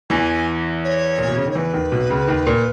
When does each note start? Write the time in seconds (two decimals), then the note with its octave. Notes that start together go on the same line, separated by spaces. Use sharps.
0.10 E2 E3 G#5
0.83 C#5
1.18 A#2
1.27 B2
1.37 C#3
1.47 D#3 C#5
1.55 E2 E3 B4
1.73 D#2 D#3
1.92 B1 B2
2.10 C#2 C#3
2.28 D#2 D#3
2.46 A#2 A#3